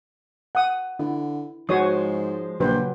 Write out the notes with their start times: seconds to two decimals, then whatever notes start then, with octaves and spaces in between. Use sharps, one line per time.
0.55 F#5 D#6
0.99 D3 E4
1.69 G#2 F3 G#3 F#4 C5 C#5 D#6
2.60 A#1 C#3 F#3 G4 B4 C5